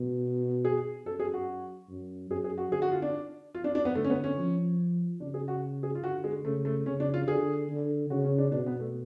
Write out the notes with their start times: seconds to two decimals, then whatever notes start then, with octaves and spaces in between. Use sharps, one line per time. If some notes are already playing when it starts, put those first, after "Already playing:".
Already playing: B2
0.65 G#4
1.06 F#2 A4
1.20 G#4
1.34 F#4
1.88 F#2
2.30 F#2 G#4
2.44 G#4
2.58 F#4
2.72 D3 G#4
2.82 F#4
2.92 F4
3.02 D4
3.55 F4
3.64 D4
3.75 D4
3.85 B3
3.95 D3 A3
4.04 C#4
4.10 B3
4.24 C#4
4.38 F3
5.20 C#3 D4
5.34 G#4
5.48 F#4
5.83 G#4
5.95 F4
6.03 D3 F#4
6.24 G#3
6.45 C#3 A3
6.65 A3
6.86 C#3 C#4
7.00 D4
7.14 F4
7.27 D3 G#4
7.69 D3
8.10 C#3 F#4
8.24 C#4
8.38 D4
8.52 B2 D4
8.66 B3
8.80 A3